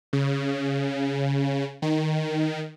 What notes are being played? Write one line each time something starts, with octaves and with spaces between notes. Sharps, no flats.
C#3
D#3